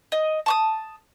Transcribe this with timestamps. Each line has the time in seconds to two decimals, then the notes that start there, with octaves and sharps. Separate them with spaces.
0.12 D#5
0.46 A5 C#6 D#6